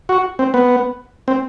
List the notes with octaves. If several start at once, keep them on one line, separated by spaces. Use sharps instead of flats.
F#4
C4
B3
C4